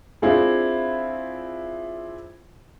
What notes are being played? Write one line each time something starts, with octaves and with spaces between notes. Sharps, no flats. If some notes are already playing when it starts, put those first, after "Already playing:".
C4 D4 E4 F4 G#4